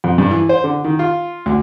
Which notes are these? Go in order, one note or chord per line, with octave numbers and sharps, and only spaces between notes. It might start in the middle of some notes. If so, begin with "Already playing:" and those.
F2
G2
E3
C5
D3
D#3
F4
D2